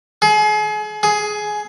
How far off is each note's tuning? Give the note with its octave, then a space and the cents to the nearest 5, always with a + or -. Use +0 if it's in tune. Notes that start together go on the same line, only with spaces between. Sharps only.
G#4 +35
G#4 +15